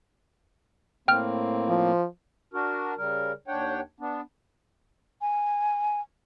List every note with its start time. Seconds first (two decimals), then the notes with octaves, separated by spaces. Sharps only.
1.08 A2 A#3 C4 G5 F6
1.69 F3
2.54 D4 F#4 A#4
2.98 C#3 G3 A#4
3.48 D#2 D4 C#5 F#5 G5
4.00 B3 D4
5.21 G#5